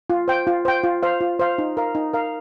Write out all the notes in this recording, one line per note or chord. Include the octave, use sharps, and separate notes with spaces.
F4
C5 G5
F4
C5 G5
F4
C5 F5
F4
C5 F5
D#4
A#4 F5
D#4
A#4 F5